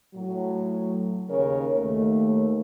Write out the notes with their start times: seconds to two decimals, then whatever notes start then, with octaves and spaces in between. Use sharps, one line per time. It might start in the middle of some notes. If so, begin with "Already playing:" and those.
0.15 A2 F#3
1.30 D#2 C#3 A#4 C#5
1.79 D#2 A3